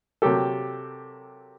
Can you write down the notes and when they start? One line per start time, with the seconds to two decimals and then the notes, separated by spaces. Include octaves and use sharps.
0.22 C3 F#3 A#3 G4 A4